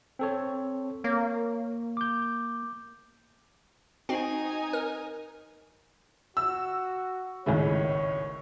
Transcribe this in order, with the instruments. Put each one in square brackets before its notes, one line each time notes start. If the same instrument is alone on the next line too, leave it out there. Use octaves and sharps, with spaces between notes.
[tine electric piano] C4 A4 C#5
[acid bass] A#3 [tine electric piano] C#5
[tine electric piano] D6 G6
[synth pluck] C4 F#4 [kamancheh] D#4 G#5
[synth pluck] A#4
[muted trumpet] F#4 [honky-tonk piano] E6
[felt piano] G#1 C#2 A2 [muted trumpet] C#5